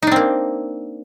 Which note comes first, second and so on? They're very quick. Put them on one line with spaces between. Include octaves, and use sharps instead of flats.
D#4 D4 C4 A#3